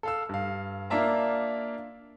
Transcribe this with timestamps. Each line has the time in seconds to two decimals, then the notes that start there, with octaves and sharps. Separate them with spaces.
0.03 A4 F5 E6
0.29 G2 F5
0.90 A#3 D4 F4 E5 A5 A#5